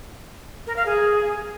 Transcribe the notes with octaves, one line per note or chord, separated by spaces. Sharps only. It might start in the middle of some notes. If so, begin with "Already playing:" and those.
A#4
F5
G#4